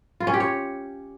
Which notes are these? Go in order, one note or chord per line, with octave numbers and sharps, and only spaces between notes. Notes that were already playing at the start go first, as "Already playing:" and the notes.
F4
C#4
G4
C#5